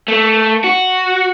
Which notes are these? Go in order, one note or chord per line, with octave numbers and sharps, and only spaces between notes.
A3
F#4